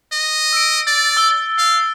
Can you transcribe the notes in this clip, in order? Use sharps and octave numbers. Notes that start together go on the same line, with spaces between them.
D#5
E6 D7
D5 A6
E6 G7
F5